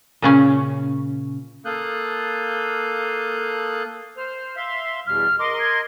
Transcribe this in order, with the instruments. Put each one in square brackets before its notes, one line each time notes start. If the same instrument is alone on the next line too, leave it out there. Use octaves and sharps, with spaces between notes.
[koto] A#2 C#3 C#4
[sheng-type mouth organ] A#3 A4 F5 D#6 F#6 G6
[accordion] C5 F6
E5 F5 C6
[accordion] E2 B2 G3 [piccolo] F6
[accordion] A#4 D#5 C6 [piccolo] D6
[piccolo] G#6